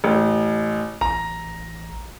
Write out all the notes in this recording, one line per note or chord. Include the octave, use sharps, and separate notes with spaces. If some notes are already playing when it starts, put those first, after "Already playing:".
A1
A1 A#5